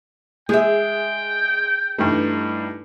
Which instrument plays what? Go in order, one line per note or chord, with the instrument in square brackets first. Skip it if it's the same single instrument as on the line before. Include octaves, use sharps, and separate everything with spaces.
[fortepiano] G#3 [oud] G#4 E5 [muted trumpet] G5
[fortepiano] G2 E3 [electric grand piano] G3 A3 D#4